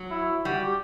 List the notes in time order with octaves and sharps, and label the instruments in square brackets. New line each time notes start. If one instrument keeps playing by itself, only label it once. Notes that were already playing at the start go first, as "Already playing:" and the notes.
Already playing: [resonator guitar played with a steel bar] F#3
[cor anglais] E4
[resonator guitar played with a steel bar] G3 [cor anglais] F#4
[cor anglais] G4